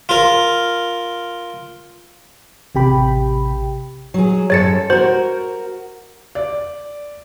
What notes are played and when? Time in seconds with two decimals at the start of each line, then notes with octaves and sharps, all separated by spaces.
0.09 F4 A#4
2.75 A1 C3 G4 G5 B5
4.14 F#3 G#4
4.50 F#2 G#4 A4 C#5 A6 C#7
4.90 F#4 A#4 C5
6.35 D5